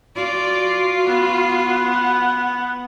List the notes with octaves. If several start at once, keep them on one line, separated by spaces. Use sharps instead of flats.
F4 F#4 D5
B3 F#5